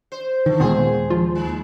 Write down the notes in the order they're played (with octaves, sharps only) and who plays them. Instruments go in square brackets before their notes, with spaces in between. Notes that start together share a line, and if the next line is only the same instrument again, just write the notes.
[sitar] C5
[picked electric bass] D#3 [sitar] A3
[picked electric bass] D#2 G#3 [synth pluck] A#2 D#3 B3 [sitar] G#4 C5
[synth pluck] F3 F4
[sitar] D#3